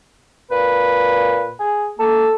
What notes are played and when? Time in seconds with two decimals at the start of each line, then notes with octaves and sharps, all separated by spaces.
0.51 A#2 B4
1.60 G#4
1.99 A#3 A4